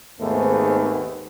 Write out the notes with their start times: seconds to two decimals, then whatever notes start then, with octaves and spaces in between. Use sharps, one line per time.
0.20 D#2 G#2 A3 B3 C4 G#4